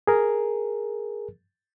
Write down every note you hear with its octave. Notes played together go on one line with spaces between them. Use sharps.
G#4 A#4